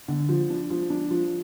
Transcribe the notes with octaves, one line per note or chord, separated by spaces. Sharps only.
D3
F3
D4
F3
D4
F3